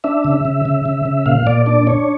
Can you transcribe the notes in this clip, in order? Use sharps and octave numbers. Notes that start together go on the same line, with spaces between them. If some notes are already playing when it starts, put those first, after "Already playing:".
D4 E5
C#3
C#3
C#3
C#3
C#3
A#2 F5
A#2 D5
D4 D5
D4 C#5